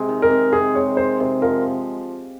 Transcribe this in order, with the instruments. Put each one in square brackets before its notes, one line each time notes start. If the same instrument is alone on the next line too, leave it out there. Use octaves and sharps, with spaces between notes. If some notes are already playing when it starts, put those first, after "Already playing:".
Already playing: [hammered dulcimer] C3 G#3
D#3
[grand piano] A#4
[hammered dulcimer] C3
[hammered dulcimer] C3 [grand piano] G#4
[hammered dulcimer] G#3 [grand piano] C#5
[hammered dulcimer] D#3 [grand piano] C5
[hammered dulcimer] C3 [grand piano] C5
[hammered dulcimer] F3 [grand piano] A#4